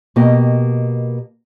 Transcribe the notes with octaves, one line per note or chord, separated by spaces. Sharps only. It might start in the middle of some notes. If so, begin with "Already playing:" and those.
B2 A#3 G4 D#5